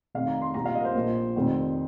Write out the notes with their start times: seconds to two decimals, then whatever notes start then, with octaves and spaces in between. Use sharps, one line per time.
0.15 F1 F2 D#3 F5
0.28 A#5
0.41 C6
0.54 C2 A#2 F3 A#5
0.65 F5
0.75 D#5
0.80 A#4
0.85 C5
0.94 A#1 A#2 F3
1.36 F1 F2 D#3